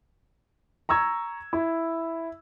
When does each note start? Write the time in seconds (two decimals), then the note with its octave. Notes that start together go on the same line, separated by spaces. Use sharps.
0.89 A#5 C#6 E6 G#6
1.53 E4